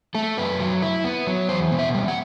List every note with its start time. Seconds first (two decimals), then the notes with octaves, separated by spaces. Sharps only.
0.15 A3 A4
0.37 F#2 B4
0.60 F#3
0.82 E4
1.04 B3
1.27 F#3
1.49 E2 C5
1.71 B2
1.79 E5
1.94 G3
2.08 F#5